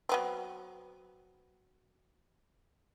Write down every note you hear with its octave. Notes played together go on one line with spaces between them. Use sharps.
F#3 B3 C4